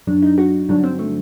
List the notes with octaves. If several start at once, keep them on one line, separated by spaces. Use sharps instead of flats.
F#2 F#3 D4
D#4
F#4
G2 D3 F#3 D4
C4
A3